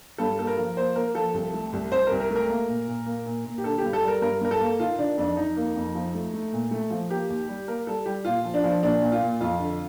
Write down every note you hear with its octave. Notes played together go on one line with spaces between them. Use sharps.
G2 A4
A#3 A4
A#4
F3
A#3 C5
A#3 A#4
F3 A4
C2
A3
C2
C2 C5
A#4
C2
A#4
A3
A#4
A#3
A#2
A#2
A#3
A#2
A#2
G4
D3 A4
G4
G2
A4
G3 A#4
G2 A#4
G2 A#4
A4
A#3
D#3 F4
D#3 D4
F2 D4
F2 D#4
A#3
F2
F3
A3
A3
A#2
A3
F3
A#3 G4
D#2
G3
A#3 A#4
G3 A4
G3 G4
A#2 F4
F3
D4
F3
A#2 D4
A#2
F4
A#2
F2 F4
D3